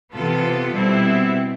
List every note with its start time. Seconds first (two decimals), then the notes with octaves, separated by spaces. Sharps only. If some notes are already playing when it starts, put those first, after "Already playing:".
0.12 C3 E3 B3 F4 A4
0.71 B2 G3 C4 E4